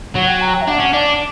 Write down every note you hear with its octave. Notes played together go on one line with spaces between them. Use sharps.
F#3 F#5
G5
A#5
G5
E5
D4 F#5
C#4
D4 D5